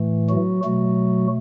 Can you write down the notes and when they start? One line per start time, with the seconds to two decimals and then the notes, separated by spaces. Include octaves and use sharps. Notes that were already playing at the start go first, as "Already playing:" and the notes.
Already playing: A2 E3 A3
0.29 F#3 F#4
0.64 B2 F#3 A3 F#4